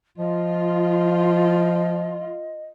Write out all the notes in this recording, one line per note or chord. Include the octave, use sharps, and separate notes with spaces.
F3 F4 D#5